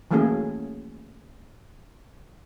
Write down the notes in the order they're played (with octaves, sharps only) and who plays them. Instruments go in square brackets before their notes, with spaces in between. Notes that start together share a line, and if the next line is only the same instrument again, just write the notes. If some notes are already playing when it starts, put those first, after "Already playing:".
[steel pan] E3 F#3 A3 A#3 C#4 G#4